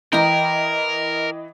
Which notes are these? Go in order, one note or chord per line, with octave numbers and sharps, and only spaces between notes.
E3 A#4 D#5 G5 A#5